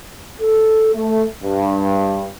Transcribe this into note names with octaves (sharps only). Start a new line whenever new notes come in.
A4
A3
G2